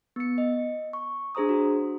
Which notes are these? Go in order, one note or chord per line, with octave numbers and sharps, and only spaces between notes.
B3 C#7
D#5
C#6
D4 G#4 C5 A#5 D#6
F#4